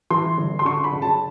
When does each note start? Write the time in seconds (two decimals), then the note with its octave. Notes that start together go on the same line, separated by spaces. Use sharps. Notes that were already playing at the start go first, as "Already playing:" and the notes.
0.10 E3 C6
0.37 G1
0.59 C6
0.65 D3 C#6
0.84 B5
0.93 F#1
1.02 A5